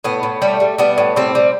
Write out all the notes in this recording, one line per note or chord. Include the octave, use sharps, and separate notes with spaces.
A2 B3
A2
G3 A3
G3
G3 B3
A2
G3 C4
G3